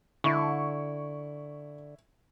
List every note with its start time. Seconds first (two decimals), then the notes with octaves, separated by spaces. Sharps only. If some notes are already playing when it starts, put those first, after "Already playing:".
0.24 D3 E4 C#6